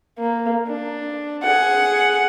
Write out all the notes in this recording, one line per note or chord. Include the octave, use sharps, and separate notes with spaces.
A#3
D4
G#4 F#5